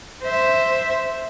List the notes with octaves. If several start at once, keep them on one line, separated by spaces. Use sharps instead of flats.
C5 E5